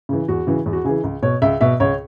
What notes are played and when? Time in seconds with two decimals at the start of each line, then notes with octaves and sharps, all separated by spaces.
0.09 C#3 E3
0.28 E2 F#4
0.47 C#3 E3
0.66 E2
0.73 F#4
0.85 C#3 E3 G#4
1.04 C#2
1.23 B2 C#5
1.42 C#2 E5
1.61 B2 E5
1.80 C#2 C#5